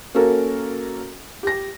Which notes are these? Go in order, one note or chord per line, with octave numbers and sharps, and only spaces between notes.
A#3 C#4 F#4 A4 A#4
G4 A#6